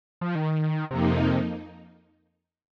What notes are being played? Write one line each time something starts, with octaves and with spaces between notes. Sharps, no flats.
F3
D#3
F2 C3 F3 A#3 D#4